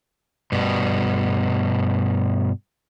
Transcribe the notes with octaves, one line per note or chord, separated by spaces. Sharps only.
G2 B2